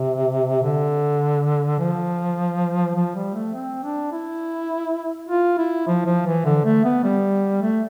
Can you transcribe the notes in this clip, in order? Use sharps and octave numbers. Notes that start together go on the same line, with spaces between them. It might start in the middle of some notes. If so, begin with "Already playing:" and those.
Already playing: C3
D3
F3
F3
G3
A3
C4
D4
E4
F4
E4
F3
F3
E3
D3
A3
B3
G3
A3